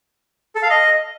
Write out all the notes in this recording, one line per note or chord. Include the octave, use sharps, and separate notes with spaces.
A4
F5
D#5